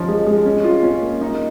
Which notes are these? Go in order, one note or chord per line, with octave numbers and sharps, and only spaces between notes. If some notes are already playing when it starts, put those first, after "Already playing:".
Already playing: F3 C#4 D#4
G#3
G#3
C#4
F4
C#4
A#3
D#4